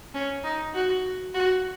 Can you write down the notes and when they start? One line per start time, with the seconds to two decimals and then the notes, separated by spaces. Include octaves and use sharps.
0.14 C#4
0.44 D#4
0.75 F#4
1.34 F#4